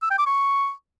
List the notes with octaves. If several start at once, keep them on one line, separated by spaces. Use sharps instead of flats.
E6
G5
D6
C#6